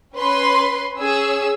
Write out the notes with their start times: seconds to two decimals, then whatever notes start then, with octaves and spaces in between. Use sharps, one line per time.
0.15 C#4 B4 C6
0.98 C#4 G#4 E6